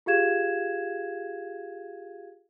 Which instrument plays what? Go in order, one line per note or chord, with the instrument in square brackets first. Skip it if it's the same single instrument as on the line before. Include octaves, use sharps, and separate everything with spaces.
[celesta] F4 G4 G#4 F5 G#6 E7